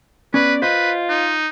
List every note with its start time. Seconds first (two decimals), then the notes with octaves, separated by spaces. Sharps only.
0.34 B3 C#4 B4 D5
0.62 F4 B4 C5 D#5
1.09 D#4